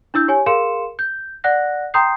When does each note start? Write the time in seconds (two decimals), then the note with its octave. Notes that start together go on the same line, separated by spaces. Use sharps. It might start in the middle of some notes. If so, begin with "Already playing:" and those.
0.14 D4 E4 E6 G6
0.28 G4 C#5 G#5
0.46 G#4 A#4 F5 C6 C#7 E7
0.99 G6
1.44 D5 F#5 F#6 A#6
1.94 G5 A#5 C6 D#6 G6 C7